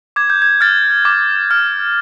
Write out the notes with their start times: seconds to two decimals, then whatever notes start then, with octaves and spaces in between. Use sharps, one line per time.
0.16 D6 G#6
0.30 G6
0.42 G#6
0.61 F6 A6
1.05 D6
1.51 F6